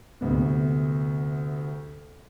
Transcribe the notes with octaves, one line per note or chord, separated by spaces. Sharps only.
D2 C3 B3